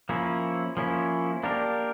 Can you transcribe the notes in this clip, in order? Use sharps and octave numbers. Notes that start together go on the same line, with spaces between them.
F3 A#3 C#4 E4
F3 A#3 C#4 E4
A#3 D4 G4 A#4